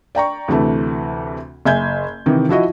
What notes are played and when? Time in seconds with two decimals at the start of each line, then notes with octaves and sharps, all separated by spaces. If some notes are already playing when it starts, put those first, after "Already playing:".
0.15 D5 G5 A#5 C#6
0.48 D2 C3 E3 A3
1.65 F#1 E5 G#5 G6 G#6
2.26 C3 D#3 E3
2.49 F3 E4 F#4 D#5